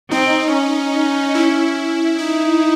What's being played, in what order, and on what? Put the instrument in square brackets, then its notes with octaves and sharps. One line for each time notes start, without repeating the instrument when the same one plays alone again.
[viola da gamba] C4 [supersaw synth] D#4
[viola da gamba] C#4
[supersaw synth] E4
[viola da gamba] D#4 [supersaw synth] E4